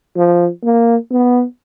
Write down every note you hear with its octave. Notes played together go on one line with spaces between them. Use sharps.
F3
A#3
B3